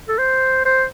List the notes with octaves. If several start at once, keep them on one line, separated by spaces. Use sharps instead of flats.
A4
C5
C5